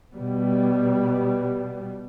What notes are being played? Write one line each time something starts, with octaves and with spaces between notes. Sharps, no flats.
B2 G3 B3